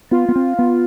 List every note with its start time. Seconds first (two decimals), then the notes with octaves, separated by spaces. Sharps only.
0.11 B3 F4
0.29 B3
0.36 C4
0.59 B3